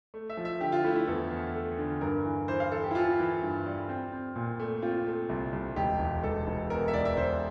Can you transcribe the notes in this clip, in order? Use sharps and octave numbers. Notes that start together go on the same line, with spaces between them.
A3
E5
F3
E5
D3 G4
F4
A3 E4
E4
E2 A4
E2
A3
D3
G2 A#4
E3
E3 C5
F5
E3 A4
G4
E4
E3 F4
E3
G2
G3
C4
C4
A#2
A3
C4 F4
A3
C2
C2
E1 G4
E1
E1 A4
E1
E2 A#4
E5
E1 D5
E5
E1 C5